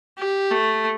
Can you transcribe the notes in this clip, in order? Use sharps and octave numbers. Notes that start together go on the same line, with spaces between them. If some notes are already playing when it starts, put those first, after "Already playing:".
G4
A3